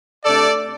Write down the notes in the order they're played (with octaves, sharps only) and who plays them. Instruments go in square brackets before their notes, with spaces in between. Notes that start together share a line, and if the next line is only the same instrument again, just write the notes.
[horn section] C3 A3 D4 A4 D5